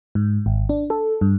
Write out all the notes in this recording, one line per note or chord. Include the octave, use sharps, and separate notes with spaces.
G#2
G#1
D4
A4
G2